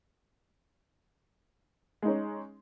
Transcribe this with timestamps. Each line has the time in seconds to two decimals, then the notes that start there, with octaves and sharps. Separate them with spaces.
2.02 G#3
2.05 D#4
2.08 C#4